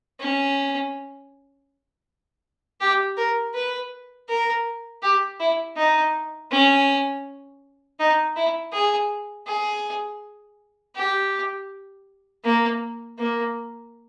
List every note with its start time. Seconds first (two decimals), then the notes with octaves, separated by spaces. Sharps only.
0.20 C#4
2.81 G4
3.17 A#4
3.55 B4
4.29 A#4
5.03 G4
5.40 E4
5.77 D#4
6.51 C#4
8.00 D#4
8.36 E4
8.73 G#4
9.47 G#4
10.96 G4
12.44 A#3
13.19 A#3